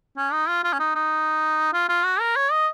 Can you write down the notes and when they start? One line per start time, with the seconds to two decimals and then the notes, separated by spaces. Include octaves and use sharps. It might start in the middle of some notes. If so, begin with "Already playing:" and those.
0.17 C#4
0.32 D#4
0.48 F4
0.64 F4
0.73 C#4
0.79 D#4
0.95 D#4
1.73 F4
1.89 F4
2.04 F#4
2.20 A#4
2.36 C#5
2.51 D#5